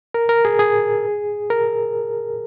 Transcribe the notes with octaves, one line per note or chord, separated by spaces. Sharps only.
A#4
A#4
G#4
G#4
A#4